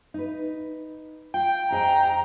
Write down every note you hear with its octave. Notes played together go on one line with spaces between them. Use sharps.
D#4 B4
F4 G5
F2 G#4 D#5 A#5